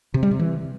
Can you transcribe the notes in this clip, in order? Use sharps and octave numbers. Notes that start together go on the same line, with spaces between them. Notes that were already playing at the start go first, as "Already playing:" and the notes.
C3
G3
C3
E3